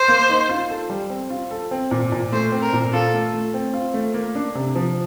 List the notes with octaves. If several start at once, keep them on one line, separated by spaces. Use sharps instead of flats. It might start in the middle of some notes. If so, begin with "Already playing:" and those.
Already playing: C5
A#3
D#4
F4
A4
G3
C4
F4
A4
C4
A#2
A#2
A3 C5
C4
A#4
A#2
F4 A4
A3
A3
C4
F4
A3
A#3
D4
C3
F3